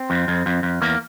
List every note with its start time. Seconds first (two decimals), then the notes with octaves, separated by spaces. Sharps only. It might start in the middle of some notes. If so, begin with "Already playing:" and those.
Already playing: C4
0.10 F2
0.28 F2
0.46 F2
0.63 F2
0.82 E2 A#3